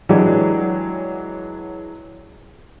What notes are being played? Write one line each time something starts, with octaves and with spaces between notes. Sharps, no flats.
E3 F#3 G#3 D4 G4